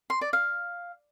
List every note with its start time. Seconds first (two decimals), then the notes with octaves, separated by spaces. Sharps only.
0.10 C6
0.21 D5
0.33 F5